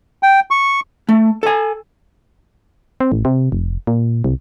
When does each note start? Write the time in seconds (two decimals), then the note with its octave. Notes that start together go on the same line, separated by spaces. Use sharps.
0.23 G5
0.51 C#6
1.09 A3
1.43 A4 G#5
3.00 C4
3.12 A1
3.25 C3
3.52 F1
3.87 A#2
4.24 C2